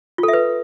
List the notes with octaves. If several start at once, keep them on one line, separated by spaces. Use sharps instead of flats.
F4
A4
E5
B4